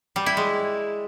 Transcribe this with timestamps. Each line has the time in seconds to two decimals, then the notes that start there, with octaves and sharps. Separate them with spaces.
0.16 G3
0.26 E4
0.37 G#3